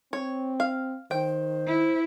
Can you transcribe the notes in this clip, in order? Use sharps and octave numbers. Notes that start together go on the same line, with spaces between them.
C4 C#5
F5
D#3 C5 G5
E4